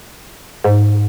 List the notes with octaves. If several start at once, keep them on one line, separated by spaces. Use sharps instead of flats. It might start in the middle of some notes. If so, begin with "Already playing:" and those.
G#2